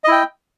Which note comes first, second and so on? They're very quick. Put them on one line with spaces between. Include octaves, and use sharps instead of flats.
D#5 E4 G5